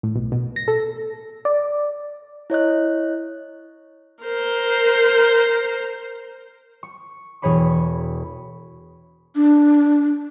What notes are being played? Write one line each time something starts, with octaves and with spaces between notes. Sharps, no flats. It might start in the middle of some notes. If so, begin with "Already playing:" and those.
A2
B1
B2
A#6
A4
D5
E4 C#5 D#5 F#6
A#4 C5
C#6
E1 G#4 C#5 B5 C#6
D4